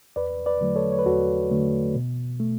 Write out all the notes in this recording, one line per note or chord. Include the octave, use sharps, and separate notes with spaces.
E2 B4 D5
B4 D5
D3 F#3 A3
A4 C#5
C#5
B4
E2 F#4 A4
D3 F#3 A3
B2
A3